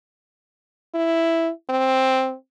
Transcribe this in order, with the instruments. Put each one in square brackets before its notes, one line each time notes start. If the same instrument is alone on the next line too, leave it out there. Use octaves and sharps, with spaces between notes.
[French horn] E4
C4